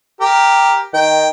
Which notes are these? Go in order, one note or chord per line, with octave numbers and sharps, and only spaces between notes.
G4 A#4
D#3 G5